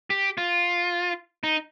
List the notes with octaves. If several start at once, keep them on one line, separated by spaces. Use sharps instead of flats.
G4
F4
D#4